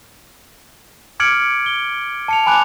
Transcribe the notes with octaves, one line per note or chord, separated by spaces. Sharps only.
D6 F6 G#6 C#7 D7 F#7
G7
A5 C#7 F7
G#5 B5 D6 F#6 F7